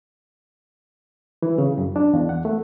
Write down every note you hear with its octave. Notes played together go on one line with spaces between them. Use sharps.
E3
C#3
F#2
D4
E2
F#5
A3